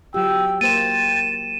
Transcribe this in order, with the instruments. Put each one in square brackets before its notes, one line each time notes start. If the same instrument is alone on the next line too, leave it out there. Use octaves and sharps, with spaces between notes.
[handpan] F#3 F4 G4 [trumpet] G5 [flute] E6
[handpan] A#3 C5 [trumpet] G5 [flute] A6 [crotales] D#7 E7